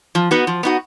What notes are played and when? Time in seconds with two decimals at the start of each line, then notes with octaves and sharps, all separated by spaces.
0.15 F3
0.31 B3 D#4 F#4
0.47 F3
0.63 B3 D#4 F#4